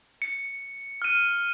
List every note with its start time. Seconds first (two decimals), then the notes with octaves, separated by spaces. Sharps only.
0.22 C#7
1.02 F6 D#7